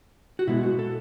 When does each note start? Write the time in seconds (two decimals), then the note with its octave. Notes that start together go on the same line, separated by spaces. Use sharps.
0.39 F#4
0.47 B2 G#3 B3 E4
0.63 F#4
0.79 A4